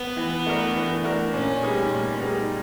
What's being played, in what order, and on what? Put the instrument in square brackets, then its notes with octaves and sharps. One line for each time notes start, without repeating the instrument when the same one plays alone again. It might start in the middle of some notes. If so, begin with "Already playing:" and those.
Already playing: [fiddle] B3
[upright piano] E3
A3 D4 F#4 A#4
E3
A3 D4 F#4 A#4
[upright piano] A#2 [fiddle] C#4
[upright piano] G3 B3 D#4 G#4
A#2
G3 B3 D#4 G#4